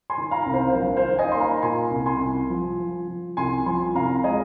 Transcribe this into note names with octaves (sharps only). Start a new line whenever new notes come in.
G#5 C6
D#3
F5 A#5
C2
C5 F5
C5
A#1 A#4
C5 F5
D#3
D#5 G#5
A#3 C6
F5 A#5
A#2 G#5 C6
C2
G#5 C6
C2
F3
F3
F3
C2 G#5 C6
F3 G#5 C6
C2 F5 A#5
G#3 D#5 G#5